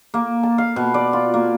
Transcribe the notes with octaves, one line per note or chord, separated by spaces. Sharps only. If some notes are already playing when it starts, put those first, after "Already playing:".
A#3
A5
F5
B2
D5
F4
A#3